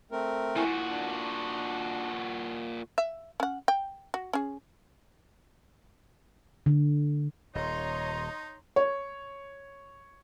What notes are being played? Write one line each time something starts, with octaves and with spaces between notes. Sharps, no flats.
A3 C4 A#4
A#2 E4 F#4 G#5
D4
E5
C#4 F#5
G5
F#4
C#4 G#4
D3
D#1 D#4 C#5 D#5 A#5 C6
C#5